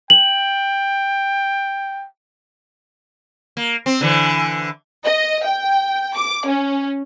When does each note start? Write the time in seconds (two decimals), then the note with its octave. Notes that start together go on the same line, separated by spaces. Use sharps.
0.10 G5 F#7
3.57 A#3
3.86 C4
4.01 D3 E3
5.07 D#5
5.44 G5
6.16 D6
6.47 C#4